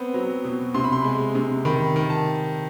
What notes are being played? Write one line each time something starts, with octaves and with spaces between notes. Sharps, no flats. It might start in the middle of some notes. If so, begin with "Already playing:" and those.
Already playing: B3 C4 B5
F#3
B2
C3 C6
B5
C6
G#3
C3
D#3 B5
D#3
A5